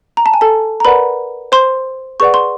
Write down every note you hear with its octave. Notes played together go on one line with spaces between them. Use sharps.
A#5
A5
G#5
A4 A5
A#5
A#4 B4 D5 F#5 B5
C5 C6
G#4 B4 D5 F#5 C#6
C6